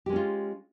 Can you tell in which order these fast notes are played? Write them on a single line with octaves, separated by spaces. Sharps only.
G4 G#3 C#4 F4